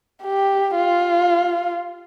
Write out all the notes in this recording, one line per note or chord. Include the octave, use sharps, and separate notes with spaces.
G4
F4